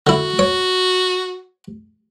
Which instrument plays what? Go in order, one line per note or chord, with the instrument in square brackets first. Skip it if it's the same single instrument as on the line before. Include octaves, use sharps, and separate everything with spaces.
[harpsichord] D3 E4 [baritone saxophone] F#4
[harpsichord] C#5